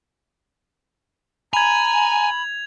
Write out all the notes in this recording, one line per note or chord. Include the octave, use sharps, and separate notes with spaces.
G#5 A#5 B5 G#6 F7